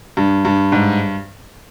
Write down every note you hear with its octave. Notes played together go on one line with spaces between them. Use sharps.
G2
G2
G#2